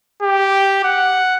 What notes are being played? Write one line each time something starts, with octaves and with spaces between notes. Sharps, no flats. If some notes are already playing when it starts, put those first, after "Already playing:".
G4
F#5